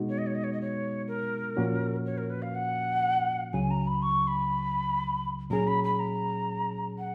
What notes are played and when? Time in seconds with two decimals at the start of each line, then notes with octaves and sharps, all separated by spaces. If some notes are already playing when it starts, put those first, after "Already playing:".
Already playing: B2 G#3 B3 D#4 F#4
0.09 C#5
0.18 D#5
0.27 C#5
0.35 D#5
0.44 C#5
0.53 D#5
0.61 C#5
1.08 A#4
1.57 A#2 F3 A#3 C#4 F#4
2.06 C#5
2.17 A#4
2.30 B4
2.42 F5
2.55 F#5
3.53 C#2 C#3 F#3 G#5
3.71 A#5
3.87 B5
4.02 C#6
4.28 B5
5.50 A#2 F#3 C#4 G#4 A#5
5.67 B5
5.84 B5
5.99 A#5
6.99 F#5